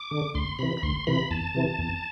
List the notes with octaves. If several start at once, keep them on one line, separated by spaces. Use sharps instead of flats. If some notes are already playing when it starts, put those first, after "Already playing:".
Already playing: D6
D3
D2 C6
C3 E3 B5
B5
D2 C6
C3 E3 B5
E2 A5
C3 E3
E2